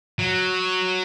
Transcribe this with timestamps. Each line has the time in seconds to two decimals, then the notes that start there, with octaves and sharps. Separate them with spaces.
0.19 F#3